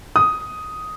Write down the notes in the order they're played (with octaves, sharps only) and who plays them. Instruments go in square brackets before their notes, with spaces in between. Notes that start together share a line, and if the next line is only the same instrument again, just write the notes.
[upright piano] D#6